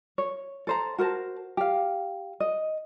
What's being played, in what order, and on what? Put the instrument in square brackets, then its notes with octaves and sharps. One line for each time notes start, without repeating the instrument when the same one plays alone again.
[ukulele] C#5
A4 C5 A#5
F#4 A#4 C5 A5
G4 F5
D#5